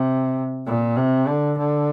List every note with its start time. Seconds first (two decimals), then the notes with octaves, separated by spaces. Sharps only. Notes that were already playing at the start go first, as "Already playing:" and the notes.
Already playing: C3
0.66 A#2
0.97 C3
1.27 D3
1.58 D3